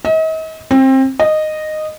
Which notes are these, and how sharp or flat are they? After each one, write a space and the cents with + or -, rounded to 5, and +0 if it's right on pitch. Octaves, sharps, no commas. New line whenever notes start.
D#5 +40
C4 +25
D#5 -10